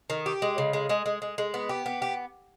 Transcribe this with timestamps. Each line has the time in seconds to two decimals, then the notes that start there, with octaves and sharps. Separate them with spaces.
0.10 D#3
0.26 G4
0.42 G#3
0.58 C#3
0.73 G#3
0.89 G#3
1.06 G#3
1.22 G#3
1.38 G#3
1.54 B3
1.69 G4
1.86 B3
2.02 G4